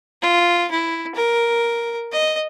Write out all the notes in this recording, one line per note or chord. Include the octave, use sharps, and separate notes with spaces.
F4
E4
A#4
D#5